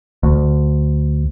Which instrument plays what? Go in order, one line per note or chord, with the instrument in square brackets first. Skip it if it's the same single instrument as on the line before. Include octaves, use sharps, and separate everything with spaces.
[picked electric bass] D2